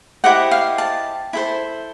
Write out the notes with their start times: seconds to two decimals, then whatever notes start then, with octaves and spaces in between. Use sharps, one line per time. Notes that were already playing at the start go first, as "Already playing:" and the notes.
0.24 E4 G4 C5 D#5 F#5
0.51 F5
0.78 A5
1.33 E4 A4 C5